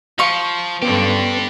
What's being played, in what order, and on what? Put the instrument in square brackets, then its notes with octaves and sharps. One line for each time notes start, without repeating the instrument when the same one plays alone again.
[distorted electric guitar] F3 [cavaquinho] F5 C#6
[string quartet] G2 D3 C#4 [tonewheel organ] B3 [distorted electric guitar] D4 G4